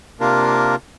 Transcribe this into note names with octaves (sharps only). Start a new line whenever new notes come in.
C3 A#3 D4 F4 A#4